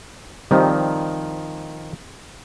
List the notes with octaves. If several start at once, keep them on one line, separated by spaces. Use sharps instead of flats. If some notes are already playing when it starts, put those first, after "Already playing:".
D#3 F3 G3 C4 D#4